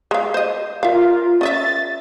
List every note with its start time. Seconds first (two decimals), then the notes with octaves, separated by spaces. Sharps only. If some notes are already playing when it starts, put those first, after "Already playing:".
0.11 G#3 F5
0.34 C5 D#5
0.83 F4 A#4 E5 F5
1.41 C#4 D#5 E5 A6